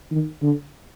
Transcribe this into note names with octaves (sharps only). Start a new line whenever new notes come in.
D#3
D3